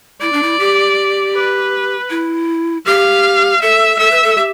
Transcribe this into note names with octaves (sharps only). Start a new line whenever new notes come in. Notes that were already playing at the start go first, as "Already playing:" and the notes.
E4 D5
D4
E4
G4
B4
E4
G4 F5
A4 E5
A4 E5
B4
A4
G4